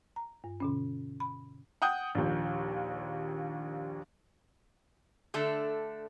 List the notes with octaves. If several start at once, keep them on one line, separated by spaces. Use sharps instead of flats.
A#5
G2
B2 D3 C#4
B5
F#5 G5 D#6 G6
A#1 D#2
D3 A3 D4 A4